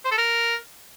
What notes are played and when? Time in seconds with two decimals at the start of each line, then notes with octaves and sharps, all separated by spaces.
0.05 C5
0.11 A4
0.18 A#4